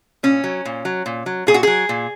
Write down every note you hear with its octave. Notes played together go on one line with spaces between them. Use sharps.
A#2 C#4
F#3
A#2
F#3
A#2
F#3
A#2 G#4
F#4
F#3 G#4
A#2